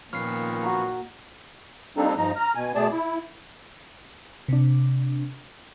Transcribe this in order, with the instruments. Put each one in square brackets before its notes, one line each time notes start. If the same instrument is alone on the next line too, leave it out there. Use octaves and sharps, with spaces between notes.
[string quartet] A#2 D#3 [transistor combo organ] F3 B3 C#4 [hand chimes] F6 C7
[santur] F#4 A#5
[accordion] G3 A#3 C4 D4 D#4 A4
G2 F3 D#4 A#5
A#5 F6
B2 G#5
B2 A3 G#4 D5 A5
E4
[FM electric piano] C3 D4